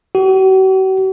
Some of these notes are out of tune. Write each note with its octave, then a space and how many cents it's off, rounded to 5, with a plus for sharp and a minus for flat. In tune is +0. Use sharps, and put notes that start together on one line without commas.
F#4 +45